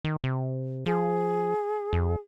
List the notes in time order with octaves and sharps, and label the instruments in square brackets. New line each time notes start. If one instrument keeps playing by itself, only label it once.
[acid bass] D#3
C3
[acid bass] F3 [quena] G#4
[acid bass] F2